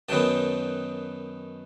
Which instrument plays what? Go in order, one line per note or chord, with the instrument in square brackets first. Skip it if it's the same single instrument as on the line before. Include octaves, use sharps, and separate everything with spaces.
[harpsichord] F#2 D#3 F#3 B3 D#4 G5 A5